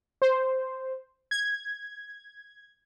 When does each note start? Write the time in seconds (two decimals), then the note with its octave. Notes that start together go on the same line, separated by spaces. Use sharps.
0.22 C5
1.31 G#6